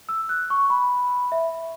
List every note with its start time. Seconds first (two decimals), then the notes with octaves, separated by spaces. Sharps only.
0.09 E6
0.29 F#6
0.50 C#6
0.70 B5
1.32 E5